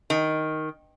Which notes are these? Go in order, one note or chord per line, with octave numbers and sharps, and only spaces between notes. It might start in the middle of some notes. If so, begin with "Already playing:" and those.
D#3